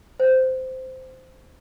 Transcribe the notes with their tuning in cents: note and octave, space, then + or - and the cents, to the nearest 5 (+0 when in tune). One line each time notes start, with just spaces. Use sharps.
C5 -10